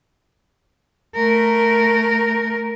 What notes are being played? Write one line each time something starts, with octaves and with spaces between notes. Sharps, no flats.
A3 A#4